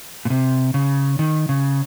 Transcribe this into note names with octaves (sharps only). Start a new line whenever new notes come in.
A#2
C3
C#3
D#3
C#3